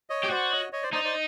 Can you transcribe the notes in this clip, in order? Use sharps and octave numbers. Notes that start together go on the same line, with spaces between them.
C#5 D#5
G4
F#4 C5 D5
C#5 D#5
C#5 D#5
C5 D5
D#4 C5 D5
C5 D5